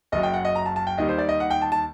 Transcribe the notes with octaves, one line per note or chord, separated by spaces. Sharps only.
F#1 F#2 F#3 D#5
G5
F#5
D#5
A#5
A5
A5
G5
D#2 D#3 G3 D#5
C5
D5
D#5
F#5
G5
A5
A5